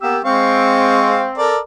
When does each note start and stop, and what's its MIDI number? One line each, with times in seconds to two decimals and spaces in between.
0.02 0.16 58
0.02 0.16 59
0.02 0.23 67
0.02 0.16 88
0.25 1.26 56
0.25 1.52 60
0.25 1.26 77
0.25 1.26 85
1.38 1.59 69
1.38 1.59 70
1.38 1.59 74